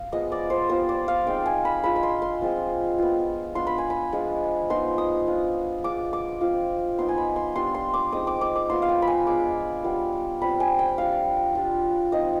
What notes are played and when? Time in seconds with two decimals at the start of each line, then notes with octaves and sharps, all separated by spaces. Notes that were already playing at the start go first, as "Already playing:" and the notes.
Already playing: F5
0.12 F3 G#3 B3 D#5
0.32 D5
0.50 C5
0.69 G3 B3 F4 C5
0.89 D5
1.08 F5
1.27 G#3 C4 D#4 G5
1.46 G#5
1.65 B5
1.83 G#3 D4 F4 B5
1.96 B5
2.03 C6
2.22 C6
2.41 F3 G#3 C4 F4
2.98 B3 F4
3.55 B3 D4 F4 C6
3.67 B5
3.78 G#5
3.90 B5
4.12 F3 G#3 D4 F4
4.70 F3 B3 D#4 C6
4.98 D#6
5.27 B3 D4 F4
5.84 G#3 D4 F4 D6
6.13 D6
6.41 F3 C4 F4
6.98 B3 D#4 C6
7.09 G#5
7.18 B5
7.36 C6
7.55 G3 B3 D4 F4 C6
7.74 C6
7.94 D6
8.12 G#3 C4 D#4 D#6
8.27 D6
8.41 D6
8.55 D6
8.70 F3 B3 F4 C6
8.82 F5
8.89 G5
9.02 B5
9.07 G#5
9.27 G#3 B3 D4 D6
9.84 G3 B3 F4
10.41 G3 C4 F4 B5
10.60 G#5
10.79 G5
10.98 G3 D4 F4 F5
11.55 G3 D4 F4
12.12 F3 C4 D#4 D#5